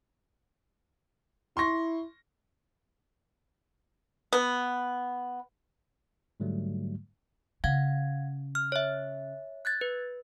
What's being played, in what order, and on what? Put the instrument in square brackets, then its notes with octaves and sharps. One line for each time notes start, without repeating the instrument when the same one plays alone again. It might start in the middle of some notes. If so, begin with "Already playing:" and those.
[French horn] E4 [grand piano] C6 C#6 A#6
[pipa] B3
[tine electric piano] G#2 D3 F#3 G3 A3
[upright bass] C#3 [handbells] F5 F#5 G#6
[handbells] F6
C#5 E5
F#6 G#6 A6
B4